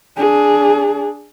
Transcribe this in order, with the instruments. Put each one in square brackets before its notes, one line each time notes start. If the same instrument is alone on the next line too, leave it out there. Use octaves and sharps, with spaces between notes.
[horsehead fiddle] D4 G#4